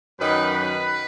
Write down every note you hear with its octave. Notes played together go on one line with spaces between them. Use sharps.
F#2 D#3 F#3 B4
B4